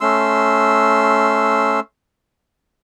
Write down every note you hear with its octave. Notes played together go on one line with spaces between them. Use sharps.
A3 C#4 C6 E6